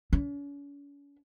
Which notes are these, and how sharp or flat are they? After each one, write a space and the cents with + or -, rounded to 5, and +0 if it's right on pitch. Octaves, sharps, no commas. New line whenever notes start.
C#4 +40